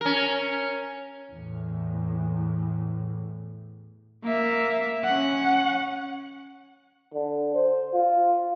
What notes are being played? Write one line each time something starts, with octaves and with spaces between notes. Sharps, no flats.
C#4 A#4
E2 A2
A#3 E5
C#4 F#5
D3
C5
F4